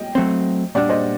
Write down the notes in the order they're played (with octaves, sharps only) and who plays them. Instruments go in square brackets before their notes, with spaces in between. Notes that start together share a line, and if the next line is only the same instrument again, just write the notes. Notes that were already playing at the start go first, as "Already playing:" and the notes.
Already playing: [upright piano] D#5 G5
[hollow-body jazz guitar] F#3 A3 C4
[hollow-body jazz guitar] A#2 G3 D4 [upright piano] D5 F#5
[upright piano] C5 D#5